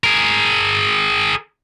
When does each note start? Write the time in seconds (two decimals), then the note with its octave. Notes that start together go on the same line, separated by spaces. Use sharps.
0.04 G#4 A#4